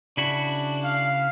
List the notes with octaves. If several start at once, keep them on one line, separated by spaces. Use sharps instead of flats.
C#3 D4 E4 F#4
F5